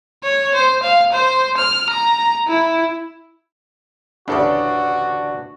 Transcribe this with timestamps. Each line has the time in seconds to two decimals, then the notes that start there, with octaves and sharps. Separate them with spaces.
0.23 C#5
0.54 C5
0.83 F5
1.12 C5
1.57 F6
1.90 A#5
2.48 E4
4.28 A1 D2 C#3 D4 F#4 A4 D5